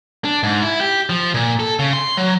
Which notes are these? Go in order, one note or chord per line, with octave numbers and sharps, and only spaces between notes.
D4
G#2
E4
G4
F3
A#2
A4
C#3
C6
F#3